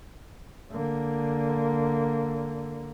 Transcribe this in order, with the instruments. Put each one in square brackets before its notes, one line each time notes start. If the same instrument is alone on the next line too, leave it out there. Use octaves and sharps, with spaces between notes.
[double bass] D3 A#3